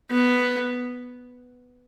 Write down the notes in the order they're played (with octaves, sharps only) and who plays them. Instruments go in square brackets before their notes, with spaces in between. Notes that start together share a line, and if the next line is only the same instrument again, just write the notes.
[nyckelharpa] B3